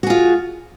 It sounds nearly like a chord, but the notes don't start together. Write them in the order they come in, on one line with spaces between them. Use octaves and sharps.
F#4 G#4 F4